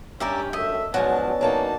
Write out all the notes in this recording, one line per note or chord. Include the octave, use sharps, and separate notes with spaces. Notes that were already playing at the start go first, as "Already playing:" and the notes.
G2 C#4 G4 A#4 D5 E5
F#2 A3 D#5 E5
G#2 F3 F#3 B3 C#4 D4 F#4 A5
F#3 A#3 D#4 A5